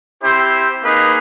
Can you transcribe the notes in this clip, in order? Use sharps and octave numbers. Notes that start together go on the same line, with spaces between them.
C4 E4 G4 C5
A#3 D#4 G#4 B4